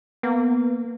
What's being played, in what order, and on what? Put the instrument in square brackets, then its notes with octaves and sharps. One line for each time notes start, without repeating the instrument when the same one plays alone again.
[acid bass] A#3 [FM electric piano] B3